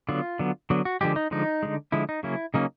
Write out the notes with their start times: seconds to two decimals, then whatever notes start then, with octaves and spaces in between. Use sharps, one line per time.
0.09 D3 F#3 B3 F4
0.39 D3 F#3 B3
0.70 D3 F#3 B3
0.85 F#4
1.01 D3 F3 G#3 G4
1.16 D#4
1.31 D3 F3 G#3 D#4
1.63 D3 F3 G#3
1.92 D3 F3 G#3 E4
2.09 D#4
2.23 C#3 F#3 A#3 C#4 E4
2.54 C#3 F#3 A#3 C#4 D#4